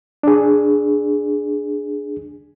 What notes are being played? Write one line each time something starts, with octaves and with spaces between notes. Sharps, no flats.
D4 G#4